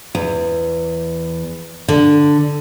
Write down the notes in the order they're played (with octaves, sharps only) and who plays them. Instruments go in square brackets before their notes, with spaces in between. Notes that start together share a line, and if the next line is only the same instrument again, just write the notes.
[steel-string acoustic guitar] E2
D3